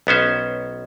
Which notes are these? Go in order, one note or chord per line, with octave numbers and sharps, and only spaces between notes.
B1 B3 C#4 C5